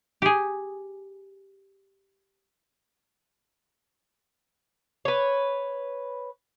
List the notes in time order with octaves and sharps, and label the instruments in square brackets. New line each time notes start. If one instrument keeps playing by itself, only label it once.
[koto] G4 G#4
[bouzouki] B4 C#5